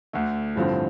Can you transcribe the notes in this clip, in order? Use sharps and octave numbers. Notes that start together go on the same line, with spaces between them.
D2 D3 A3
A1 G2 D3 F3 C4